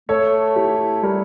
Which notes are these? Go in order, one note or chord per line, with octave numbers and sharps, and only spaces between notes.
A3 A4 C#5
E4 G4
G3 G4 A#4